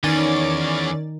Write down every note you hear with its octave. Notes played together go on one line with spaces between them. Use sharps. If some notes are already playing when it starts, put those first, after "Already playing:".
E2 D#3 E3 C#4 D5 A6